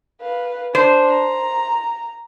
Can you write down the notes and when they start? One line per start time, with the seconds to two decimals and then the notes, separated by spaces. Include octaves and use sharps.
0.21 B4 F5
0.75 D4 C5
1.10 A#5